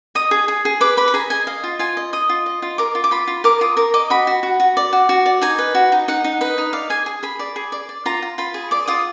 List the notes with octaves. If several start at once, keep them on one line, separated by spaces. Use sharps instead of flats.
D#5 D#6
G#4
G#4
G#4
B4 D6
B4 B5
B5
G#4 A#5
D#5 G#5
D#5 F5
F4
F4 G#5
D#5
D#5 D#6
F4
D#5
F4
A#4 D6
F4
D6
F4 B5
F4
A#4 D6
F4 D#6
A#4 D6
D#5 D6
F#4 B5
F#4
F#4
F#4
D5
F#4
F#4
D5
D#4 G#5
B4
F#4
D#4
D#4 F#5
D#4
B4 D#5
D#4
D5 F5
G#4 G#5
G#4
G#4 B5
D5
G#4
D5
D5
F4 A#5
F4
F4 B5
G#4
D5 D6
F4 D#6